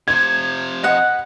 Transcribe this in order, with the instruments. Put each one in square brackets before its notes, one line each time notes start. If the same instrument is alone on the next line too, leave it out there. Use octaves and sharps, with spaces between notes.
[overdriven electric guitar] C3 F3 [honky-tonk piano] G#6
[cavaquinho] B4 F#5 [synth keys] D#5